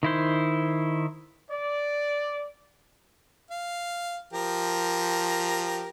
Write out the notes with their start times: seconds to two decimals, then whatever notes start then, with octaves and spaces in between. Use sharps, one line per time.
0.03 D#3 E4 C5
1.51 D5
3.50 F5
4.33 F3 G4 A#4